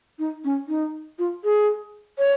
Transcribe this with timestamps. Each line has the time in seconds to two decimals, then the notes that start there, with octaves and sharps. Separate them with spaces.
0.19 D#4
0.44 C#4
0.68 D#4
1.19 F4
1.44 G#4
2.19 C#5